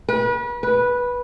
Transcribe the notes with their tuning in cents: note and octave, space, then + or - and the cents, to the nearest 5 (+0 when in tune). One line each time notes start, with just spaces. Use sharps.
B4 -35
B4 -10